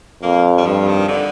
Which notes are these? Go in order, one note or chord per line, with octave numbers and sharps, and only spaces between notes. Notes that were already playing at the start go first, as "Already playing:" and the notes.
F2 A#3
G3
G2 F3
D#3
D3